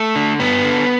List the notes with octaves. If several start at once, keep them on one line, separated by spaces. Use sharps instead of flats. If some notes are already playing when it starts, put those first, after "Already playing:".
Already playing: A3
D3
G2 B3
D3